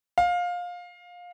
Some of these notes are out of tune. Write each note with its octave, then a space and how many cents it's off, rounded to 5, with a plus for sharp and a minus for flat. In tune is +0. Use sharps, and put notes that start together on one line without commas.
F5 +20